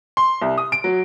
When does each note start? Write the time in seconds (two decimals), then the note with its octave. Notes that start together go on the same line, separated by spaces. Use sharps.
0.17 C6
0.42 C2
0.58 D#6
0.72 D7
0.84 F#3